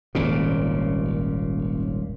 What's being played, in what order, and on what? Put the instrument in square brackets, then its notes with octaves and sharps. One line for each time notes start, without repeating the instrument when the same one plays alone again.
[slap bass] D#1 G#1 A#2 C#3